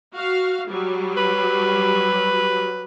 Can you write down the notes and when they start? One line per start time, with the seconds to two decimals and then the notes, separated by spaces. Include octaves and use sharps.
0.13 F#4 F5
0.69 F#3 G3
1.17 B4